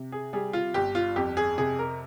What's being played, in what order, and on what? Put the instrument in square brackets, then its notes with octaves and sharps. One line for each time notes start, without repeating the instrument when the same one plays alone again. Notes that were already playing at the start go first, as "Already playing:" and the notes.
Already playing: [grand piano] C3
G#4
G3 G#4
F4
G1 G4
F4
F2 G4
G#4
C3 G#4
A#4